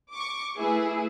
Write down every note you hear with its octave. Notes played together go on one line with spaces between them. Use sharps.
C#6 D6
A3 E4 G#4 B4